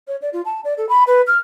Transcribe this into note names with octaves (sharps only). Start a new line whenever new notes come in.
C#5
D5
F4
A5
D5
A4
B5
B4
F6